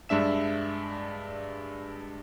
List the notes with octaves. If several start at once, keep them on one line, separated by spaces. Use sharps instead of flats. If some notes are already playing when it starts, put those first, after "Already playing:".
G2 G#3 D4 E5 E7